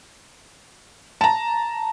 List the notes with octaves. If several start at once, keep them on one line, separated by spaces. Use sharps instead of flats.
A5 A#5